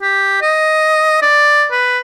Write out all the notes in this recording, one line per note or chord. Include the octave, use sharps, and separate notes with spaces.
G4
D#5
D5
B4